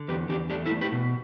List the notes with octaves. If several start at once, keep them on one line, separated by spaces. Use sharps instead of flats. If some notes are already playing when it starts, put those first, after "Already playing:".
Already playing: D3
E2 G4 B4
E2 D4 G4
A3 D4 G4
E4 A4
A3
G4 B4
B2